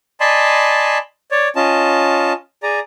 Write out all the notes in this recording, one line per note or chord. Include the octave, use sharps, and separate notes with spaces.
D5 D#5 G#5 A5 B5 C6
C#5 D5
C#4 F4 D#5 A5
G#4 D5 A#5